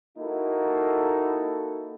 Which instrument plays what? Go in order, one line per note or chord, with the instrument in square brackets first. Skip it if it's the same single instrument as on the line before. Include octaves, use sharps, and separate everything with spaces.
[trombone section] A#3 D#4 E4 F#4 A4